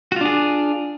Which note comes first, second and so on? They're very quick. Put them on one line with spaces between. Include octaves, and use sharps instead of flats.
F#4 F4 D4 G#4